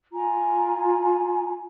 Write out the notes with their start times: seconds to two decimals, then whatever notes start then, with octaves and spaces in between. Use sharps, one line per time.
0.13 F4 G#5 A#5